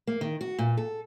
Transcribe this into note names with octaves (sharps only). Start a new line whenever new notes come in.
A#3
D#3
F#4
A#2
A4